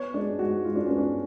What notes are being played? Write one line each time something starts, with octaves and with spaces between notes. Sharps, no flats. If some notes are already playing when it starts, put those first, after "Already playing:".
Already playing: B3 C#5
G#3 D4
G#2 F#4
G#2 F4
D4
B3 C#4
D4